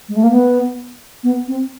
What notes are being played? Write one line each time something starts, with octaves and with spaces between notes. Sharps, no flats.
G#3
A3
A#3
B3
B3
C4